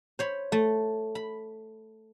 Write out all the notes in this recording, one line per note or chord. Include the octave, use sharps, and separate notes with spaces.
C5 C#5 B5
A3
B5